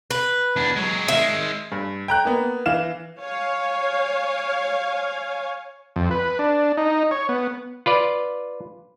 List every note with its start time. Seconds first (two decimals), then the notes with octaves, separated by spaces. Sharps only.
0.11 B4
0.56 E2 D4
0.76 F#3 G#3
1.08 D#3 G#3 E5
1.72 G2
2.08 G5 A#5 F#6
2.25 A#3 B3
2.66 E3 F5 E7
3.18 C#5 F5 G#5
5.96 F2
6.11 B4
6.39 D4
6.77 D#4
7.11 C#5
7.29 B3
7.86 F4 B4 D5